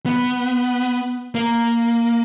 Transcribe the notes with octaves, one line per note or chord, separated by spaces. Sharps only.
B3
A#3